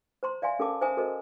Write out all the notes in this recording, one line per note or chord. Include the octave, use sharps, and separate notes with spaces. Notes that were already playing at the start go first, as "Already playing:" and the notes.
C5 A#5 C6
D5 E5 F5 G#5 C6
C#4 A4 A#4 F5 A5 D6
C5 E5 G#5 A#5 D#6
F#4 A4 A#4 C5 D#5